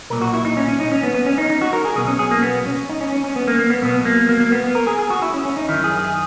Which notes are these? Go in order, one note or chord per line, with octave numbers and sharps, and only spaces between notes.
B1 A#2 A#4
F#4
E4
D#4
C#4
C#4
D#4
C#4
B3
B3
C#4
D#4
D#4
F#4
A#4
G#4
B1 B2 G#4
C#4
G#4
A#3
B3
C#4
D#4
C#4
C#4
C#4
B3
A#3
A#3
B3
B1 B2 B3
A#3
A#3
A#3
B3
B3
A#4
G#4
G#4
F#4
E4
C#4
C#4
D#4
F#2 D#3 E4
G#4
G#4